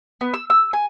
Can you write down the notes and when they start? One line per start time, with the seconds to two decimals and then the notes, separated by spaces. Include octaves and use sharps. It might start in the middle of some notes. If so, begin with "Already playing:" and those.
0.21 B3
0.34 E6
0.50 E6
0.73 G#5